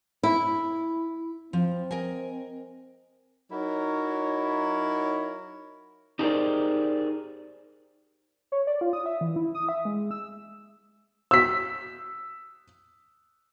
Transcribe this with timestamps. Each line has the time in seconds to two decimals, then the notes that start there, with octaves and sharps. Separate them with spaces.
0.23 E4
1.53 F3 C4
1.91 A#4 D#5 G#5
3.52 F#3 D#4 E4 A#4 C#5
6.19 D#4 G4 G#4 A#4 C5 D5
8.52 C#5
8.67 D5
8.81 F4
8.93 D#6
9.06 E5
9.21 E3
9.36 E4
9.55 D#6
9.69 E5
9.85 G#3
10.11 E6
11.31 E6 B6